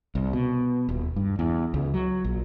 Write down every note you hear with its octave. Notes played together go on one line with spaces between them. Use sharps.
C2
B2
D#1
G2
E2
C#2
F#3
A#1